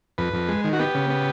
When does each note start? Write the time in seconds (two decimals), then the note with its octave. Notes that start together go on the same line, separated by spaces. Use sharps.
0.18 F2 B4
0.33 F2
0.49 G#3
0.64 D#3
0.73 F#4
0.79 B3 G4
0.94 C#3
1.10 B3